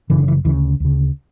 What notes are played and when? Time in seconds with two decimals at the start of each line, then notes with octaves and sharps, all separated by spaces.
0.10 F#1 F#2 C#3 E3
0.18 D3
0.28 E3
0.45 D2 C#3 E3
0.80 D2 C#3